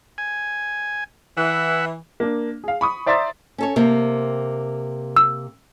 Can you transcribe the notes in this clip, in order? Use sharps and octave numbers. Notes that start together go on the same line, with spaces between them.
G#5
E3 E5 F#5
A#3 D4
G#4 F5
B5 C#6 D#6
C5 D5 E5 A#5 C6 A6
C#4 A4 C#5
C3 A#3 C4
E6